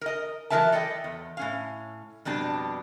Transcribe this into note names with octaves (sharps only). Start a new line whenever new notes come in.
A#4 D#5
E3 F#3 C4 A#4 E5 A5
A4 D5 D#5 G5
E2
A2 C#4 F5
F2 B2 G3 D4